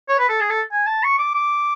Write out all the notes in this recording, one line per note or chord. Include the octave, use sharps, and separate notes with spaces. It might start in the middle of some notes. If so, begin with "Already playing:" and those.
C#5
B4
A4
G#4
A4
G#5
A5
C#6
D6
D6